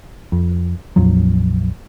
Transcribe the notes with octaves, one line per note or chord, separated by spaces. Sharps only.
F2
A#1 F2 F3 F#3